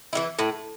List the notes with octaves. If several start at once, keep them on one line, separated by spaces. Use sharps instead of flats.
E3 G3 E4
A2